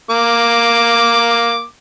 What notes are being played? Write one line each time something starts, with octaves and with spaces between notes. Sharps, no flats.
A#3 D6